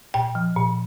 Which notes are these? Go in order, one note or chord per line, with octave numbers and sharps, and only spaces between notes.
A#2 G5
F3
A#2